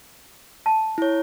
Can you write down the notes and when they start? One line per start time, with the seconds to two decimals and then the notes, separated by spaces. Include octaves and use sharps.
0.66 A5
0.98 E4 C#5